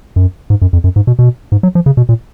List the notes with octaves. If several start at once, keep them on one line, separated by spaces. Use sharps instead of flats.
F#2
G#2
F#2
F2
F#2
G#2
B2
B2
G#2
F#3
F3
C#3
B2
A#2